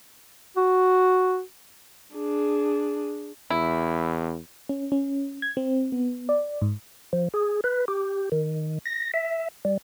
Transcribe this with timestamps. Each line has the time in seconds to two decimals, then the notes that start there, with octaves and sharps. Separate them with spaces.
0.57 F#4
2.15 D4 G#4
3.50 E2 E4
4.69 C#4
4.92 C#4
5.42 G#6
5.57 C4
5.92 B3
6.29 D5
6.62 G#2
7.13 F3
7.34 G#4
7.64 B4
7.88 G4
8.32 D#3
8.85 A#6
9.14 E5
9.65 G3